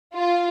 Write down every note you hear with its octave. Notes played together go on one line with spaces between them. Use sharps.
F4